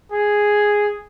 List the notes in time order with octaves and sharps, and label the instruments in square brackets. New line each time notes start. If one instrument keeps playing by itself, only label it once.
[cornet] G#4